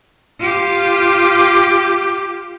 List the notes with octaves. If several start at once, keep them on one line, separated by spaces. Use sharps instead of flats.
F4 G4